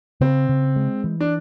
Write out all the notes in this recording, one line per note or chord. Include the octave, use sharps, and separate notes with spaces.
C#3 C4
C#3
G#3
E3
D4